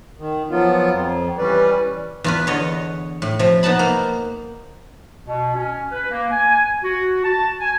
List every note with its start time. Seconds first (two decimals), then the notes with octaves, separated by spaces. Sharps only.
0.18 D#3
0.50 F3 F#3 B3 F4
0.90 F2
1.38 E3 G3 C#4 B4 D5
2.24 E2 F4 B4
2.47 E2 D3 C#5 D#5
3.22 A2
3.39 C3 F3
3.63 B3 D#4 F#5 A5 B5
3.79 A#3 C5
5.27 B2
5.55 C#4
5.92 B4
6.11 A#3
6.31 G#5
6.84 F#4
7.24 A5
7.60 G#5